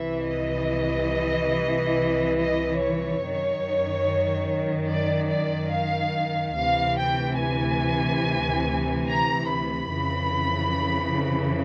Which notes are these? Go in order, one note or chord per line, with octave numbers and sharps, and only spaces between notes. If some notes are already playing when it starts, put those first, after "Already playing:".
Already playing: C2 C3 E3 E5
D#5
D#5
C#5
F#2 D#3
D5
D5
F5
D2 C3 E3 F5
G5
G#5
A#5
B5
F2 C#3 E3